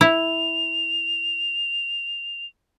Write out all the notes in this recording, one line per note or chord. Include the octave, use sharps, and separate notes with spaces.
E4 F7